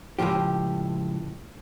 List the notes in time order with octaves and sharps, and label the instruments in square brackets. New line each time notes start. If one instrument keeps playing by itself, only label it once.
[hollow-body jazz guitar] C#2 F#2 A2 F3 G4